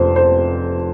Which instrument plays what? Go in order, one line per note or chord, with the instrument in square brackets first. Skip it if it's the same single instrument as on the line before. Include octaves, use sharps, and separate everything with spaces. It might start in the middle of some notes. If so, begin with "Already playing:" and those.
Already playing: [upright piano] F1 F2 F3 C5
C5